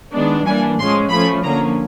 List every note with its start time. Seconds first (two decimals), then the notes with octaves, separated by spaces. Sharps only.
0.13 D#3 G#3 B3 D4
0.45 E3 G3 A#3 D4 G#5
0.78 A2 F3 G#3 C#4 C6
1.10 F3 A3 C#4 B5
1.43 D3 F3 A#3 C#4 A#5